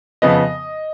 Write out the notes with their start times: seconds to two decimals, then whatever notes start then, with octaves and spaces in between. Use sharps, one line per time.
0.22 F2 C#3 F3 B3 D#5